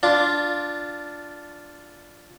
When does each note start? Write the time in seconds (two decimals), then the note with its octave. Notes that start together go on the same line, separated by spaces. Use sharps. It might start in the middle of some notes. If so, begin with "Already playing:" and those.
0.03 D4 F4